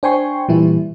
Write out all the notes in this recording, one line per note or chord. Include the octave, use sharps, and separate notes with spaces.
D4 C5 G5 G#5 C6 C#6
A#2 E3 G3 E4